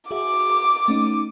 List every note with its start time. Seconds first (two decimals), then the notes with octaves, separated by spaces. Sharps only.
0.11 F#4 G#4 E5 D6
0.88 A3 C#4 D#4